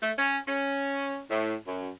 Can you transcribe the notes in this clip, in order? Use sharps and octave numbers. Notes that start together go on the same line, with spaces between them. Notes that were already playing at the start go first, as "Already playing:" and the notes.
A3
C#4
C#4
A2
F#2